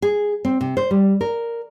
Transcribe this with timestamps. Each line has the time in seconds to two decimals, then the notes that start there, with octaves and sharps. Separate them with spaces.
0.02 G#4
0.45 C4
0.61 C3
0.77 C5
0.91 G3
1.21 A#4